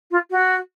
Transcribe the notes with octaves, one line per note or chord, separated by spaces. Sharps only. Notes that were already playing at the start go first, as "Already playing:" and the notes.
F4
F#4